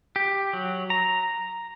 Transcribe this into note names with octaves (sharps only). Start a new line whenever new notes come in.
G4
F#3
A#5